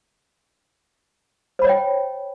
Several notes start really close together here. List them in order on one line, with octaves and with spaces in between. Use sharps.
C5 B5 C#5 D#5 G5